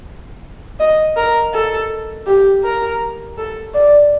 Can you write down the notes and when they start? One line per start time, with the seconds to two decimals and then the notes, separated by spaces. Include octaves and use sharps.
0.79 D#5
1.16 A#4
1.53 A4
2.26 G4
2.64 A#4
3.38 A4
3.74 D5